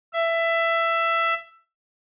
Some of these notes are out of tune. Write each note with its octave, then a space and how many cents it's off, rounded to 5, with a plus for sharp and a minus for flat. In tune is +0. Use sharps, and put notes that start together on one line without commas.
E5 +15